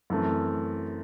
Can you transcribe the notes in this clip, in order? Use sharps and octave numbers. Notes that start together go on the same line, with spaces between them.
F#2 E3 A3 C4